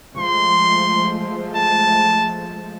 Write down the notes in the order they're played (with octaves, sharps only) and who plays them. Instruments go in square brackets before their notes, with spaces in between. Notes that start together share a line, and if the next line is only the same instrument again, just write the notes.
[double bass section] F3 G#3 A3 [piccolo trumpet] C6
[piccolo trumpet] A5